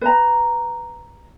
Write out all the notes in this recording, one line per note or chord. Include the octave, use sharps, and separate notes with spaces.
B4 A#5